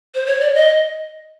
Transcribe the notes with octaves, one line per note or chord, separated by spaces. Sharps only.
C5
C#5
D5
D#5